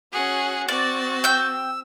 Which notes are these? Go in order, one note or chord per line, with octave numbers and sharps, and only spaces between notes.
C#4 F#4 G#4 F#5
C4 F#4 D5 A6
G5 E6 G6